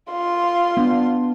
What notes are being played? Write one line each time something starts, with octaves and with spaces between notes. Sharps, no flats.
F4 C6
B3 D4